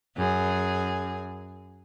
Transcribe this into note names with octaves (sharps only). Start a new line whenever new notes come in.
F#2 G#4